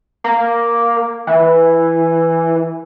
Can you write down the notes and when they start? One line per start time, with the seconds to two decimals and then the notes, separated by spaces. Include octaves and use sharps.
0.24 A#3
1.27 E3